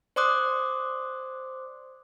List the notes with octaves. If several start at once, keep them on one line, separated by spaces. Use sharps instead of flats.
C5 D5 C6 D6 D#6 F#6